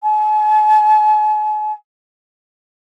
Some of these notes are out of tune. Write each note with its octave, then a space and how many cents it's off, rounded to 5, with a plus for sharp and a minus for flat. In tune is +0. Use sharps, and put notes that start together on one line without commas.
G#5 +45